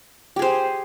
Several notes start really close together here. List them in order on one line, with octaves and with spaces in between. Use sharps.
G4 G#4 C5